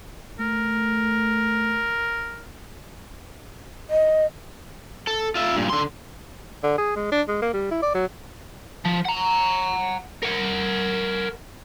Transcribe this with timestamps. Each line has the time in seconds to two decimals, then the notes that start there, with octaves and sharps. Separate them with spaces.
0.40 A3 A#4
3.90 D#5
5.07 A4
5.35 F4 E5
5.55 G2 A#2
5.70 D3 C6
6.63 D3
6.78 G#4
6.96 G#3
7.12 D4
7.28 G#3
7.42 A#3
7.53 G3
7.71 E4
7.83 D5
7.94 F#3
8.85 F3
9.05 F#5 A#5
10.23 A#4 F#5